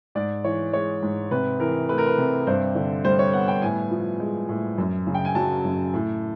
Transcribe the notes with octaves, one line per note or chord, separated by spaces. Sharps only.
G#2 D5
E3 C#5
G#3 C#5
G#2
C3 B4
E3 A#4
A3 B4
A#4
B4
C3
G2 C5
D3
G3 C5
C#5
B3 F#5
G5
A2 G#5
F3
G#3
A2
F#2
C#3
G5
G#5
F#3 A5
F#2
A2